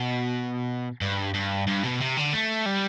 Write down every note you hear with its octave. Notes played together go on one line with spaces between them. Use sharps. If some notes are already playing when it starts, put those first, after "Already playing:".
Already playing: B2
G2
G2
G2
B2
C3
D3
A3
G3